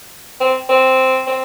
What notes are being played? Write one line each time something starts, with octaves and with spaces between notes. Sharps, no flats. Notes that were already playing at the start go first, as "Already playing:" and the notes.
C4
C4
C4